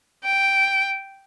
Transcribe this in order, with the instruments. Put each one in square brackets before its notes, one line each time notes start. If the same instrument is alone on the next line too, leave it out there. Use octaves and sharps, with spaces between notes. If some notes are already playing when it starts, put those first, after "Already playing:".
[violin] G5